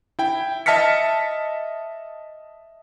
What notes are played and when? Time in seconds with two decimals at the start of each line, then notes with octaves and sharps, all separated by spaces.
0.19 E4 G5
0.66 D#5 E5 A5 F6 B6 C#7